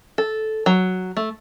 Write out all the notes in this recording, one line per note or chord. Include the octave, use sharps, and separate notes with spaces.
A4
F#3
A3